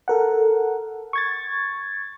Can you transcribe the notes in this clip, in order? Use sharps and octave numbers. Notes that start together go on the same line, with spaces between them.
A4 A#4 F#5
C#6 G#6 A6